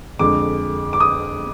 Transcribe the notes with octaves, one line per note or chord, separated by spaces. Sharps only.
F2 D3 G#3 D6
D6
D#6